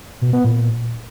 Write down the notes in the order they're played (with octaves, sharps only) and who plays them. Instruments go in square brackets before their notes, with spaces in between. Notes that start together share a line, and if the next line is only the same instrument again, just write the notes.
[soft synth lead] B2
B3
A#2